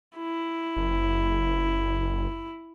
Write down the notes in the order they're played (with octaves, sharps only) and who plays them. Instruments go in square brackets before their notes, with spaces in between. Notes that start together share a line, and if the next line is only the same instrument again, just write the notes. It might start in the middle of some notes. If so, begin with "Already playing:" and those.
[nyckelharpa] E4
[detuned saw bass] F#1